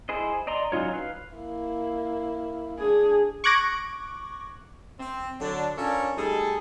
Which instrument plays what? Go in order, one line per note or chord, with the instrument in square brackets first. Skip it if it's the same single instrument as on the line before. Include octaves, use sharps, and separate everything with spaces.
[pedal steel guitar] E4 G#4 C5 D#5
D5 D#5 A#5 C6
F#3 C#4 D#4 F4 C#5
B4 F5
[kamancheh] A#3 E4
[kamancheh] D4 [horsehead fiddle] G#4
[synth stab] C#6 D6 F#6 G#6 A#6 D7
[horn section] C4
D3 F#3 D4
C#4 D4 F4 A4 A#4 C#5
G3 A3 D#4 G#4 A4